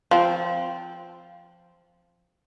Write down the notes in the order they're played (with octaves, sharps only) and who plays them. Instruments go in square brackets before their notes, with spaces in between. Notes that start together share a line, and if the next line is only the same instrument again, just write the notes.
[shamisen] F3 C4